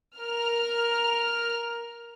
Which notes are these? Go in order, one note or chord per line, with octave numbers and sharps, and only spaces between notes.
A#4 F6